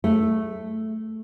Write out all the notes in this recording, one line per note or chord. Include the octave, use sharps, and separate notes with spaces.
A3